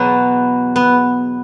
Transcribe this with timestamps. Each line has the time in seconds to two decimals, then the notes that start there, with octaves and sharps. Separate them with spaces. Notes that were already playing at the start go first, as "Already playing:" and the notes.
Already playing: E2 B2 F#3 B3
0.76 B3